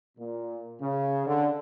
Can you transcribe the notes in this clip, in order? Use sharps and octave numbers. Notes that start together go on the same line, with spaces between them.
A#2
C#3
D3